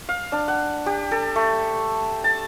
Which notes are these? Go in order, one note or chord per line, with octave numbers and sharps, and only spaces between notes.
F5
D4
F#5
G4
A4
A3
A5